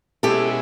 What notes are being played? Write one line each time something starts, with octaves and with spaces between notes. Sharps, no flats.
B2 G#3 C#4 E4 G4 A4